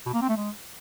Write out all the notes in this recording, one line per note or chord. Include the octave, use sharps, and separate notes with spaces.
B2
A#3
C4
A3
G#3